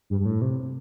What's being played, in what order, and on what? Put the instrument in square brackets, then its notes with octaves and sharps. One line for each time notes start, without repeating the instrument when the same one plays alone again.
[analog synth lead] G2
G2
A2
C3